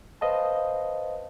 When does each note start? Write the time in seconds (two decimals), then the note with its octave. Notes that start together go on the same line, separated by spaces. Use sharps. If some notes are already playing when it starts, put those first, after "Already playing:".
0.21 B4 C5 D#5 F5 A5